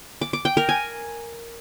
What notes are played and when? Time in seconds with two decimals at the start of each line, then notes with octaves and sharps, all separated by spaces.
0.22 D6
0.33 D6
0.45 G5
0.57 A#4
0.69 G#5